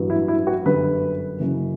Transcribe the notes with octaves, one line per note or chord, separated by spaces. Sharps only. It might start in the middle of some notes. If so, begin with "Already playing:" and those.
Already playing: A1 G2 F#3
E4
E4
F#4
G1 F#2 D3 G3 B4
F#1 F#2 C#3